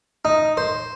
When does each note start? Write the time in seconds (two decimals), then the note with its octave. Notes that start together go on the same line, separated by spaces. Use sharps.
0.25 D#4
0.57 C5